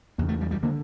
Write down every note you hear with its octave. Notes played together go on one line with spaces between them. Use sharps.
E2 C#3 A#3
A3
G3
G3
D3 A#3